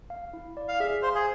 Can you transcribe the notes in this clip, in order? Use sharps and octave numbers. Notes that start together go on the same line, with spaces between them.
F5
E4
D5
F5
G#4 E5
C5 F5
G#4